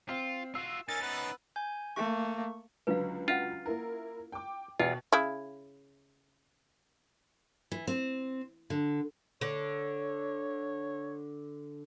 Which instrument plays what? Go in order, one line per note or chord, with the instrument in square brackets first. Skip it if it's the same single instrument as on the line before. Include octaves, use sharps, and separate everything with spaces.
[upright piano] C4 F5 C7 [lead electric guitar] F4
[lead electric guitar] F4 F#4 [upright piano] E6
[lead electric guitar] C#4 D#4 [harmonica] A#4 G#5 [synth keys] A6
[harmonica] B3 B4
[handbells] G#5 G6
[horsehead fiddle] A3 A#3 [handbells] C#6
[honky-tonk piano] C#2 D3 F#3 [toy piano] B4 F5
[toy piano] C#4 F5 F#5 [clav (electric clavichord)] F4
[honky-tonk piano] A#3 E4 A#4
G5 D6
[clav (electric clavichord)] E2 F4 [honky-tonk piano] B2 [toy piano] D#5 G5
[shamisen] C#3 E4
[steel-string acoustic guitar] E3
C4
D3
[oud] D3 [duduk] C#5